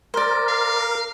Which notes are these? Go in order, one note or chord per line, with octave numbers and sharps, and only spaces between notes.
A#4 C5 D5
F5